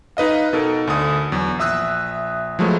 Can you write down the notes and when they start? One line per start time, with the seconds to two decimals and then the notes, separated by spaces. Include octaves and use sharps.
0.17 D#4 B4 D#5 F5
0.53 B2 D#4 A4 A#4
0.87 D2 D3 D#6
1.32 E2 F#3
1.59 A#1 E5 D#6 E6 F#6
2.59 F3 F#3 G#3 A3 B3